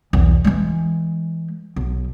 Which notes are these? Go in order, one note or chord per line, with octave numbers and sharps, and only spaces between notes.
B1 E2
E3 G#3
B1